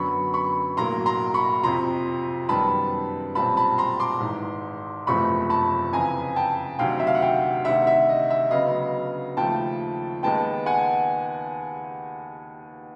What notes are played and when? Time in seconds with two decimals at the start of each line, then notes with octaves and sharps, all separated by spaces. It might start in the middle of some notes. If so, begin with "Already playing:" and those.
Already playing: F#2 D3 F#3 B3 B5 C#6
0.34 B5 C#6
0.77 B1 A2 F#3 A#3 A#5 C6
1.06 A#5 C6
1.34 B5 C#6
1.63 F2 C3 F3 A#5 C6
2.49 F#2 D#3 G3 B3 A5 B5
3.35 B1 A#2 G3 C4 A5 B5
3.57 A5 B5
3.78 A#5 C6
4.00 C6 D6
4.21 G#1 G#2 E3
5.07 F#1 E2 C3 F3 A3 B5 C#6
5.50 A5 B5
5.93 F2 C#3 E3 G#5 A#5
6.36 G5 A5
6.79 D2 C3 D#3 F#3 F5 G5
7.00 E5
7.07 F5
7.15 F#5
7.22 F5 G5
7.65 D2 C3 D#3 E5 F#5
7.87 E5
8.09 D#5
8.30 E5
8.51 D2 C#3 F#3 B3 D#5 F5
9.37 D#2 C#3 F3 A3 G5 A5
10.23 D#2 D#3 G#3 B3 G5 A5
10.66 F#5 G#5